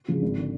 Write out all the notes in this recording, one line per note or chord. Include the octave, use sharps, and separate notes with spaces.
C#3 F3 G#3
G#1
D3